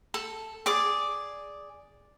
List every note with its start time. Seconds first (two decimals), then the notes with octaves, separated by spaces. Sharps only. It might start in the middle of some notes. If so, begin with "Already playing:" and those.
0.14 A4
0.66 G#4 D5 D6